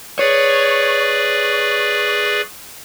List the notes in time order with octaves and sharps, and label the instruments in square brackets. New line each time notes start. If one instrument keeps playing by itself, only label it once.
[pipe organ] G#4 B4 D5 [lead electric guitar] C#5